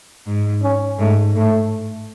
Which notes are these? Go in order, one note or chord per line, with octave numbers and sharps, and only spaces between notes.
G#2
C#4
G#2 A3
A2 A3